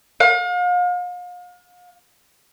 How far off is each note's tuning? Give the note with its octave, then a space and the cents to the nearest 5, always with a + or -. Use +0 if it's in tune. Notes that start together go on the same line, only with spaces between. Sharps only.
F5 +40